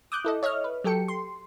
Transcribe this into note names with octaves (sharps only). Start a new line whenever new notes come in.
D6 D#6 F#6 G6
E4 A4 D#5
C#5 D#5 E5 F6
B4
F#3 G4 A4 G5 C#7
C6